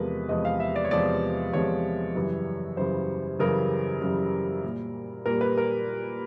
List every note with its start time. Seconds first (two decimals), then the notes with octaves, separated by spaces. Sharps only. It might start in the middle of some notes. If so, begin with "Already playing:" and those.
Already playing: E2 C3 F3 G#3 A#4 B4
0.29 E2 C3 F3 G#3 D#5
0.45 F5
0.60 E5
0.76 D5
0.84 C#5
0.91 E2 C3 F3 G#3 D5
1.53 E2 C3 F3 G#3 C#5
2.16 F#2 C#3 E3 G3
2.77 F#2 C#3 E3 G3 C5
3.39 F#2 C#3 E3 G3 A#4
4.01 F#2 C#3 E3 G3
4.64 A#2 G3
5.26 A#2 G3 A#4
5.41 B4
5.58 A#4